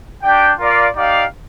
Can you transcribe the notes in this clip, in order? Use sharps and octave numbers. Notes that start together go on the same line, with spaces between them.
D4 G4 D5 G5
F4 A#4 D5 F5
D#4 G4 D5 F5